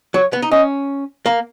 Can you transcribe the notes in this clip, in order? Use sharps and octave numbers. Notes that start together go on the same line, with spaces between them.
F#3 C#5
B3
D#4
C#4 D#5
A#3